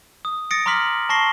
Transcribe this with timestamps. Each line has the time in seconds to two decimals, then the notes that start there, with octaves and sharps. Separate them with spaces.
0.25 D#6
0.51 D#6 A6 A#6 C#7 D7
0.66 A#5 C6 D6 F6 B6 F#7
1.09 A5 C#6 A#6 C7 G7